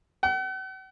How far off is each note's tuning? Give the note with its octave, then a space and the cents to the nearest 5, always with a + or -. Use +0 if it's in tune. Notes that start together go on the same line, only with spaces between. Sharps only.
F#5 +45